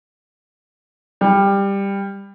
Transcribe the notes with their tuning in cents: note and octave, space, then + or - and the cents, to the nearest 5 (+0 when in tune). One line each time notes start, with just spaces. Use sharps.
G3 +15